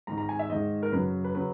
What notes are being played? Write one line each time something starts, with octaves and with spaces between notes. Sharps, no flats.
G#2 D#3 G#3 A#5
A#5
G#5
E5
G#2 D#3 G#3 D#5
A#4
F#2 C#3 F#3 B4
B4
C#3 F#3 B4